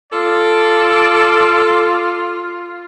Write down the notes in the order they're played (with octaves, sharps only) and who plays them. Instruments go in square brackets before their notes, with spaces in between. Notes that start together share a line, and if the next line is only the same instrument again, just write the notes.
[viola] F4 [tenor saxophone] A4 [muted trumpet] D5